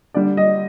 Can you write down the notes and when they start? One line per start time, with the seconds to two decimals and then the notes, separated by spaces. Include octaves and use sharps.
0.14 D3 G3 D5
0.37 D#5